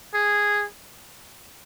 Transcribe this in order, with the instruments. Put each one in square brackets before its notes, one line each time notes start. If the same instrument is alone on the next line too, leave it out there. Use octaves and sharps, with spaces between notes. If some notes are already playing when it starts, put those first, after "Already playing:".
[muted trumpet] G#4